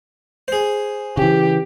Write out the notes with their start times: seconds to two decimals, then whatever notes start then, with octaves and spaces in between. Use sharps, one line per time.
0.48 G#4 C5
1.17 C#3 E3 G4